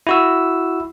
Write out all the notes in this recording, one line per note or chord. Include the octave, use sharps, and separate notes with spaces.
E4 F#4 E6